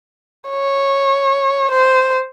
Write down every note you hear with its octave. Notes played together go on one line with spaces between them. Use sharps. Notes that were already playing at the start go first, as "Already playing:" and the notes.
C#5
C5